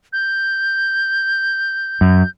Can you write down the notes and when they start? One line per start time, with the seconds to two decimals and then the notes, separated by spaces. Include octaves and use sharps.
0.13 G6
2.01 F#2